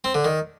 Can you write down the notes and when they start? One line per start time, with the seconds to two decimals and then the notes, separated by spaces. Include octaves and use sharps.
0.04 C4
0.14 D3
0.25 D#3